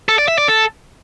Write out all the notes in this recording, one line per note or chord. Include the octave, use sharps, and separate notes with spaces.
A4
D5
E5
D5
A4